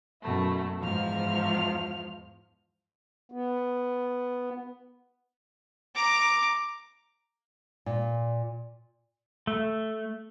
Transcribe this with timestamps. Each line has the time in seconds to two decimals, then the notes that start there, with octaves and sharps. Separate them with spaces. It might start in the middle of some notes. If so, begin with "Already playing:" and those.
0.22 F#2 B2 A3 E4
0.80 E2 G#2 F3 F6
3.32 B3
5.95 A#5 D6
7.86 A#2
9.47 A3